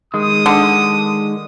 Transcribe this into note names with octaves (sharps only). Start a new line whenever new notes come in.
D#3 G#3 D#6
D3